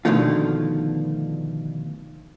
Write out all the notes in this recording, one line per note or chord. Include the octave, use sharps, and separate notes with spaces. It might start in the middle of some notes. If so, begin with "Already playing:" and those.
B2 D3 D#3 F3 A3 F4